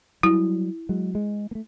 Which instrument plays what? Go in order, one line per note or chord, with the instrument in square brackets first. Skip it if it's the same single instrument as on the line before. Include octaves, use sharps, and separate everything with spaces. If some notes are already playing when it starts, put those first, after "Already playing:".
[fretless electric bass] F#3 G3 [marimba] E4
[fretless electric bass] F#3 G#3
G#3
A3 A#3